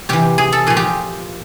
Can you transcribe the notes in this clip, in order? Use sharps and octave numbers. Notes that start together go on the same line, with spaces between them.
C3 E3 G4
G#4
A4
A#2 F3 G#4
G4